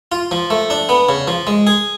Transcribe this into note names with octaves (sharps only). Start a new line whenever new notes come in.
F4
F3
A3
D4
B3
C#3
F3
G#3
G#4